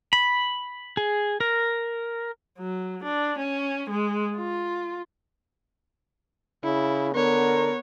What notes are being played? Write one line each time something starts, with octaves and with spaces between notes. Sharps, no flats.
B5
G#4
A#4
F#3
D4
C#4
G#3
F4
C#3 E4
D3 B3 A#4 C#5